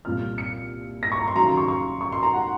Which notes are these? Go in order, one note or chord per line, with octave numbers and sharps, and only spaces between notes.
C2 A#2 F3 F6
C#7
A#6
C#6
A#5
C6
D#2 C#3 F#3 A#5
C6
C#6
C#6
C#6
C6
A#5
F#5